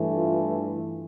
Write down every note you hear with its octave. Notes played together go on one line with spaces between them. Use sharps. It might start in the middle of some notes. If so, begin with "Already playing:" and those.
Already playing: G2 E3 A3
F4